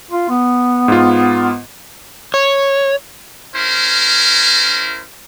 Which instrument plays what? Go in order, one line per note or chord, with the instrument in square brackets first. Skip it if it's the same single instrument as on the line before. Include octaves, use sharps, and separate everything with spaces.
[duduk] F4
B3
[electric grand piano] G#2 F4
[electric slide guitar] C#5
[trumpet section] C#4 E4 A#4 C5